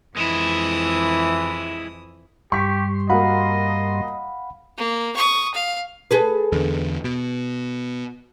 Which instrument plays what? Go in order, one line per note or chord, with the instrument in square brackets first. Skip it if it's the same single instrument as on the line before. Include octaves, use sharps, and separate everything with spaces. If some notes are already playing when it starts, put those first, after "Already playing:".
[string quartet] F2 E3 D#6 [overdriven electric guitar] G#3 E4
[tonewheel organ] G2 G3 C6 [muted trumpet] G4 [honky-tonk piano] C#6 B6
[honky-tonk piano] A#3 F#4 [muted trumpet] D#5 [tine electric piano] F5 F#5 B5
[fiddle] A#3
C#6 D#6
F5
[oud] G#4 A4 B4
[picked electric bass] E2 D3
B2